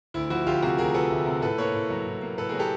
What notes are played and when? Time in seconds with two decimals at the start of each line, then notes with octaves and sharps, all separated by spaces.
0.14 D2 E4
0.30 F3 E4 F#4
0.46 D2 F4 G4
0.62 C3 F#4 G#4
0.78 D2 G#4 A#4
0.94 F3 A4 B4
1.10 D2
1.26 C3
1.42 A2 A4 B4
1.58 A#3 B4 C#5
1.74 A2
1.90 F#3
2.07 A2
2.22 A#3
2.38 A2 A4 B4
2.49 G#4 A#4
2.54 F#3
2.59 G4 A4